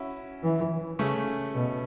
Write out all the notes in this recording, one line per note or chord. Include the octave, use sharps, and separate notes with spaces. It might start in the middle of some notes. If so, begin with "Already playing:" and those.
Already playing: C#4 E4 F#4
E3
C#3 A3 C#4
B2